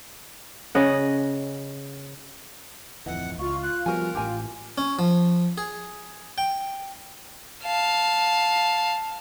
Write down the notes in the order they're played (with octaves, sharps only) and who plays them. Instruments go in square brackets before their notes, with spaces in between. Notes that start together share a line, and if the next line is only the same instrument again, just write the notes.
[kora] C#3 D#5 F#5
[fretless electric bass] D1 F2 E3 [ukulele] E4 D#5 [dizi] F#5
[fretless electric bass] C#2 [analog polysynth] F4 F5 [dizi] C#6
[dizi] F#6
[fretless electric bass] F3 G3 B3 [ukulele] F#4 C5 G#5 [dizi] A#4
[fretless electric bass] A1 A2 [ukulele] G4 G#5
[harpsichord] C#4
F3
G#4
G5
[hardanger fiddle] F5 A5